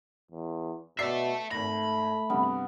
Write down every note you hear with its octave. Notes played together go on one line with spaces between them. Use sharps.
E2
B2 D5 E5 A5 E6 C7
G#1 A3 B5 A#6
G2 C3 B3